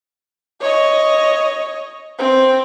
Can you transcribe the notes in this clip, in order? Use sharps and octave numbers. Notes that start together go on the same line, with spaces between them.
C#5 D#5
C4